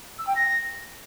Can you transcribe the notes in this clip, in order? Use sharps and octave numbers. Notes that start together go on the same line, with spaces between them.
E6
G5
A#6